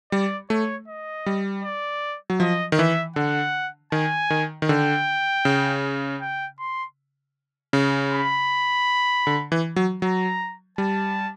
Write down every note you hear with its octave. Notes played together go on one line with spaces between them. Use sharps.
G3 D5
A3 C#5
D#5
G3
D5
F#3
F3 D#5
D#3
E3 E5
D3 F#5
D#3 G#5
D#3
D#3
D3 G5
C#3
G5
C6
C#3
B5
D3
E3
F#3
F#3 A#5
G3 A5